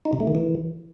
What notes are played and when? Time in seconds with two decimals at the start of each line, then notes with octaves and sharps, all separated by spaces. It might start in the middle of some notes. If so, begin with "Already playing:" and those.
0.05 D#4
0.13 C3
0.20 A3
0.27 D#3
0.35 E3